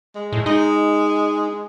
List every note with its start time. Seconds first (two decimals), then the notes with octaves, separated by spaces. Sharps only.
0.15 G#3
0.32 A2
0.46 G#3 D#4